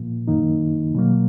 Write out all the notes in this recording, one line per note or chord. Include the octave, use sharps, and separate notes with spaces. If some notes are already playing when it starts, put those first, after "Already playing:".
Already playing: A#2 F3 A#3
F#2 D#3 A#3 D#4
B2 F#3 A#3